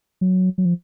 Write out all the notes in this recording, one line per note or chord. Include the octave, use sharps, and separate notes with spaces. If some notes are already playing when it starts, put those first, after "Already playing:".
F#3
F#3
F3